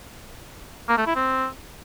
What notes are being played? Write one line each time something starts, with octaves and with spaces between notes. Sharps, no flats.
A#3
A3
E4
C4